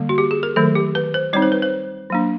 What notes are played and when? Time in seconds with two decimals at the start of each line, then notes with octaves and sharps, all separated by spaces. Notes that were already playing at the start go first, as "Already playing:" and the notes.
Already playing: D3 G3 A#3
0.09 F#4
0.18 G4
0.31 G#4
0.43 A#4
0.56 D#3 F#3 A3 A4
0.75 G4
0.95 B4
1.14 C5
1.33 G3 C4 D#4 C#5
1.42 C5
1.52 B4
1.62 C5
2.10 F#3 A#3 D4